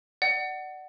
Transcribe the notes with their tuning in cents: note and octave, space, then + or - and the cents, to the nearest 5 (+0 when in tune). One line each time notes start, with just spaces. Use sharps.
D5 +30 F#5 +20